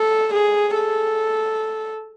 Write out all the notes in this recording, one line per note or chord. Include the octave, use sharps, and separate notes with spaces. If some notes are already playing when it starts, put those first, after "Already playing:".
Already playing: A4
G#4
A4